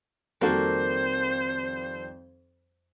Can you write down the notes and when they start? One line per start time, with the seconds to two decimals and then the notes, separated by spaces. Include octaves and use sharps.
0.42 F2 D#3 G3 A#3 F#4 A4 C5